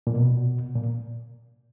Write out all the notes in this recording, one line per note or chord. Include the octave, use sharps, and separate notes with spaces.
A#2
B2
A#2